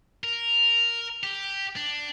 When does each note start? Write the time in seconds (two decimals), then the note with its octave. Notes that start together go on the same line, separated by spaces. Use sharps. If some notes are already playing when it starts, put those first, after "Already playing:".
0.24 A#4
1.23 G4
1.76 D4